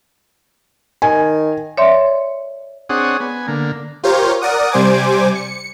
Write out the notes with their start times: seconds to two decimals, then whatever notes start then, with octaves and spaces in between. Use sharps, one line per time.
1.02 D#3 G#5
1.77 C#5 D5 E5 C6
2.89 C4 D4 G#4 C#5 F#5 D#6
3.20 B3 G#5
3.48 D3 A#3
4.03 F4 G4 A#4 C5 C#5
4.42 A#4 D5 F#5 D#6
4.71 C3 G3 C5 G#5 D6 G#6
5.35 C#7